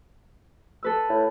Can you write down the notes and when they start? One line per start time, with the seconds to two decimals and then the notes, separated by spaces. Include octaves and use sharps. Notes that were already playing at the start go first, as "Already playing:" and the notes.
0.83 A4 B4 E6
1.10 A2